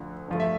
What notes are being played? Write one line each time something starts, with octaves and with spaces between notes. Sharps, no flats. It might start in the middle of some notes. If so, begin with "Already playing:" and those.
Already playing: D2 D3 F3
G2 F3 A3
E5